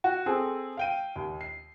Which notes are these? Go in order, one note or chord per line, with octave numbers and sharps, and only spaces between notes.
F#4
C4 G#4 A4
F5 G5 D#7
D#2
C7